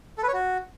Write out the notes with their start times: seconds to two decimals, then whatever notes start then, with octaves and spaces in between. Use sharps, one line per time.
0.18 A4
0.23 B4
0.28 C#5
0.33 F#4